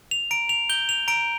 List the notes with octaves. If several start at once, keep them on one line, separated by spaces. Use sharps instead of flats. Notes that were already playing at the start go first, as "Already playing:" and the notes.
F7
A#5 D7
F7
G6 G7
F7
A#5 D7